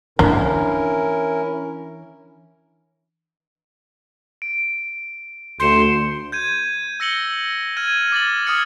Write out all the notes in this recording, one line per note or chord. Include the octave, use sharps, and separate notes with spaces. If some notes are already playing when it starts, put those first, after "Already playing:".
E3 A#3 C#4 D4 E4 A#4
D7
D2 C6 G6 C#7 E7
G6 G#6 D#7
E6 A#6 C#7 F#7 G7
F6 G#6 D#7
D6 A6 F#7
D#6 F6 G#6 C#7